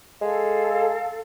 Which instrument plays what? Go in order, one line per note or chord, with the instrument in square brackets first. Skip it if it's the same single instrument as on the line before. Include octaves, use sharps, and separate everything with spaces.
[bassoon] G#3 [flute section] A4 F5